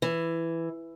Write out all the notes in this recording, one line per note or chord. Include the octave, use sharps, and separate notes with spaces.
E3